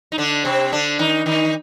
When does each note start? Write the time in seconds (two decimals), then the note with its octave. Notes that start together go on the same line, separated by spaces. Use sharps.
0.12 D#4
0.18 D3 D4
0.45 C3 C4
0.72 D3 D4
0.99 D#3 D#4
1.26 D#3 D#4